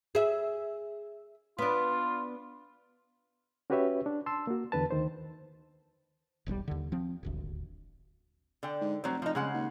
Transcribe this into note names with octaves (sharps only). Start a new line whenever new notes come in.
G#4 E5
B3 D4 F4
C#4 F#4 G4 B4 C#5 E5
D4
A5 C6 E6
A#3 F#4
E2 D3 B4 A5
D2 D#3 C5
E1 B1 A#2 G3
D#2 D3
F3 C4
D#1 G#1 D2
D3 G5
G#2
F1 F#3 C4
F3 D#4
C#3 G#3 F#5
D#2